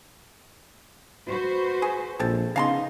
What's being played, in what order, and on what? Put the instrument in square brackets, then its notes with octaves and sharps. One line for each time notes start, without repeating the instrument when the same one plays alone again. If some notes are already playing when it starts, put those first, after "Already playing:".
[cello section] F#4 B4 C5
[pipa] G#4
[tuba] A#1 [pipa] C4 A4
[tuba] C#3 [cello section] B3 D#4 [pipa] F5 A5 C6